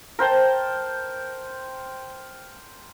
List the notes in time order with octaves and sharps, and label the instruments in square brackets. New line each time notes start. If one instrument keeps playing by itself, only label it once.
[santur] A#4 C5 G5 A5